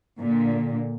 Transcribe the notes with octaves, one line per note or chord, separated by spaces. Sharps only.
A#2 D3